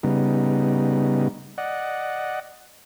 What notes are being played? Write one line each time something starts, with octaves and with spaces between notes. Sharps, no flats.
C#3 G3 B3 D#4
D5 D#5 F#5